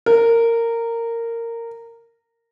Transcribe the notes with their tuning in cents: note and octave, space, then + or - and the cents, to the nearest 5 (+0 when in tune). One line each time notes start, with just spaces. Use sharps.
A#4 -15